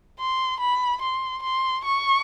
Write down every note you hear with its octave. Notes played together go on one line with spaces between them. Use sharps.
C6
B5
C6
C6
C#6